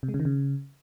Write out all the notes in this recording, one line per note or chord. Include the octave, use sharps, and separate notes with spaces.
C3
G#3
C#3
D#3
C#3